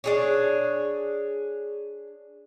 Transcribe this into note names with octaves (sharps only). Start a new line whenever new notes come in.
D4 G#4 C#5